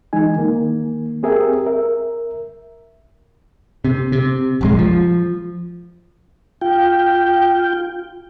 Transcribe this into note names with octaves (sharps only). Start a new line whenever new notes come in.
E3 G#3 D#4 G#5
D#3 A#3
C4 G4 G#4 A#4 E5
A#4 E5
C3
C3
F1 A#1 G#3
F3
F4 G5